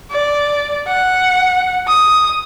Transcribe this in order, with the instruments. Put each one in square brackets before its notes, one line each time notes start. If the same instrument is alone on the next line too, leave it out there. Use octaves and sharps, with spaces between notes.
[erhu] D5
F#5
D#6